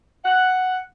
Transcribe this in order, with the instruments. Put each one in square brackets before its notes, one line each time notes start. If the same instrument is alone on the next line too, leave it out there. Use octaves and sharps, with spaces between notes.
[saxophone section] F#5